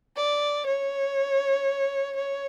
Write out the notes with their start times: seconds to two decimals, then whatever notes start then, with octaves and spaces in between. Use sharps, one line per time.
0.17 D5
0.67 C#5
2.16 C#5